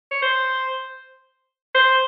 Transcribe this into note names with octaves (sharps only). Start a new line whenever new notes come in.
C#5
C5
C5